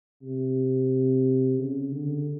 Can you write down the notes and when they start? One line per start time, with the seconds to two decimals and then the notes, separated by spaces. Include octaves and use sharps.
0.23 C3
1.59 C#3
1.92 D3